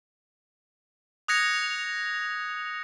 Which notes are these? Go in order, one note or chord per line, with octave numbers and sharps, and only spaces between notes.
D#6 F#6 G#6 A#6 C#7 F7